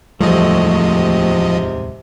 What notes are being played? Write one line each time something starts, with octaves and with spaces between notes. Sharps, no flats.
D1 E2 G#2 C3 F3 G3 A3 D#5